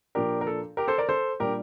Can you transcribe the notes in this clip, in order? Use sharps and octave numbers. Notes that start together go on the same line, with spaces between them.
A#2 F3 A#3 D4 G4 A#4
A#4
A4
G4 A#4
A4 C5
A#4 D5
A4 C5
A#2 G3 D4 G4 A#4